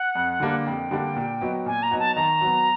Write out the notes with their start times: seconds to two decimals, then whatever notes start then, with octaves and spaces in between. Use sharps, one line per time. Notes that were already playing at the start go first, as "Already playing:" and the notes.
Already playing: F#5
0.15 F2
0.40 D3 G3 A#3 D4
0.66 F2 G5
0.91 D3 G3 A#3 D4
1.16 A#2
1.41 F#3 B3 D#4 F#4
1.66 A#2 G#5
1.83 A#5
1.91 F#3 B3 D#4 F#4
1.99 A5
2.16 D#3 A#5
2.41 F#3 B3